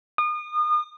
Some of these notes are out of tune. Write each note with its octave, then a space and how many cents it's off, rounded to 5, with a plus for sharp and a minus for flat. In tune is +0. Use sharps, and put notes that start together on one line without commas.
D#6 -35